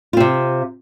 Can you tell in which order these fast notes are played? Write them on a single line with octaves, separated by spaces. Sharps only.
F4 C4 C3